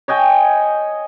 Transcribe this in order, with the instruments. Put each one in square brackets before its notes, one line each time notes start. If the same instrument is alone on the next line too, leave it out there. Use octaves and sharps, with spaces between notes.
[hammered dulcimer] C#5 D#5 G5 G#5